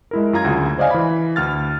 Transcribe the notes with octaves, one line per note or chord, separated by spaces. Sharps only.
G#3 E4 A#4
F#2 F4 A#5 G#6
D2 C#3
C5 D5 D#5 F5 G#5
E3 B5
D2 F6 A6